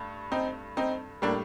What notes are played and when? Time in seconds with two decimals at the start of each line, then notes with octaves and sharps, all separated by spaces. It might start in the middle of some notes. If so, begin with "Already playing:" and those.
Already playing: G2 A3
0.32 C4 D#4
0.77 C4 D#4
1.22 A2 G3 A#3 D4